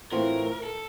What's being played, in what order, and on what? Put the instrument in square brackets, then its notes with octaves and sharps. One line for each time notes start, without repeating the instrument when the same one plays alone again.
[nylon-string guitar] A2 E3 A3 C4 F4 [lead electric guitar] A#4
[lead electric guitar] A4